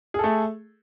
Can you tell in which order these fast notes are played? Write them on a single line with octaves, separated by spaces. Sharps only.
G#4 A4 A3